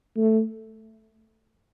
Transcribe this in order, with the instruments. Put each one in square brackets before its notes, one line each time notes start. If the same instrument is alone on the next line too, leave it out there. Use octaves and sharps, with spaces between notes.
[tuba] A3